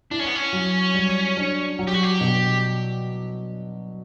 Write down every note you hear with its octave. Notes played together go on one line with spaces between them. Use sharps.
D4 E4
C#4
B3
C#4
F#3
G3
D4
F#3
G4
F#4
G4
B2